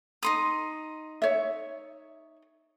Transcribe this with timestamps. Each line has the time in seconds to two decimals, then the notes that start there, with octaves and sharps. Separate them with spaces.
0.23 D#4 C6 D#6
1.22 C#5 E5